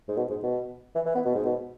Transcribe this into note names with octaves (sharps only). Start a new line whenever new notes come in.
G#2
B2
G#2
B2
E3
E3
B3
B2
G#2
B2